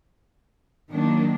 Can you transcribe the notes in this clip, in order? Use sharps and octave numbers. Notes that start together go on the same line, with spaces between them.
D#3 F#3 A#3 D4